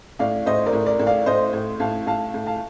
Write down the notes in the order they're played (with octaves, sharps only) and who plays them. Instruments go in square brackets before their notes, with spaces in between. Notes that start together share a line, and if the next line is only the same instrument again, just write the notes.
[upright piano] A2 D5 F5
A2 C5 D#5
A#4 D5
A2
A#4 D5
A2
D5 F5
A2 C5 D#5
A2
A2 F5 A5
A2 F5 A5
A2
F5 A5